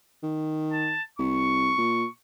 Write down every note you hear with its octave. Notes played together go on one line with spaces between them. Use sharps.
D#3
A5
C2 C#6
A#2